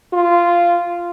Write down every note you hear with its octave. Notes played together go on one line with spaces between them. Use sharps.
F4